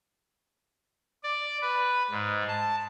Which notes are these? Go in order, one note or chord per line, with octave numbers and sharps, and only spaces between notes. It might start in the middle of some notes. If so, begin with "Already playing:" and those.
D5
B4
G#2
A5